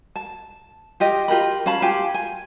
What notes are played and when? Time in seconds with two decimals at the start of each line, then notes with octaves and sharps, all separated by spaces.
0.16 A5
1.00 F4 G4 D#5
1.28 F4 G4 A#4 B5
1.66 C#4 F5 A5 B5
1.82 F4 G4 F5 G#5
2.14 G#5